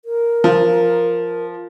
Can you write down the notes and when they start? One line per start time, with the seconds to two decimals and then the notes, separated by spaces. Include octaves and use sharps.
0.05 A#4
0.44 F3